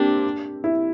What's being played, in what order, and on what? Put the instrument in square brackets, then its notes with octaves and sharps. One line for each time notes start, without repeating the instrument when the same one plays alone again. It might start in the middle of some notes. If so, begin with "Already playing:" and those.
Already playing: [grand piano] A#3 C4 G4 [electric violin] D4
[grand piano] E4